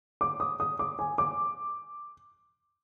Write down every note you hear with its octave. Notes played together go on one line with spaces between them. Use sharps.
D6
D#6
D#6
D6
G#5
D6